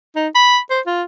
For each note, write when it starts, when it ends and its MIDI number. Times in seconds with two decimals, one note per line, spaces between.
0.16 0.28 63
0.35 0.59 83
0.70 0.80 72
0.86 1.03 65